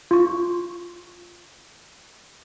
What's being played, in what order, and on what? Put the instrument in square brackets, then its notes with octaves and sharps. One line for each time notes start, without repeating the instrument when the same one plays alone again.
[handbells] F4 C#6